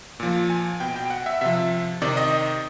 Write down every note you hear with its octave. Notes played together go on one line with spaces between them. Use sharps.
A#2 F3
G#5
B2 G5
G5
F#5
E5
C3 F3 E5
C3 D#3 D5
D#5